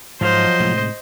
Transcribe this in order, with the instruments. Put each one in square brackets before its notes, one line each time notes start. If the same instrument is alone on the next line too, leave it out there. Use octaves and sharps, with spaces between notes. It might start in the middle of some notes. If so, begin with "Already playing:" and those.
[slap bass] G#2 [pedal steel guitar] F3 F#3 F5 [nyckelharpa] C5 D#5
[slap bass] A2 C3 G#3